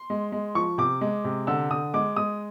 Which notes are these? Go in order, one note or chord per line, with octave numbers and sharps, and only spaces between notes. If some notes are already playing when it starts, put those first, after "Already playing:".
Already playing: C6
G#3
G#3
F3 C#6
C3 D6
G#3
C3
D3 E6
D3 D#6
G#3 D6
G#3 D#6